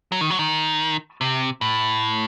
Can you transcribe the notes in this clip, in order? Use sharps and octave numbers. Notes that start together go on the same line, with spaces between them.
F#3
D#3
F#3
D#3
C3
A2